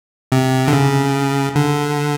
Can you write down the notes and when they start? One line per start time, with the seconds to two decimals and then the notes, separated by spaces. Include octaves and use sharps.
0.32 C3
0.68 D3
0.73 C#3
1.55 D3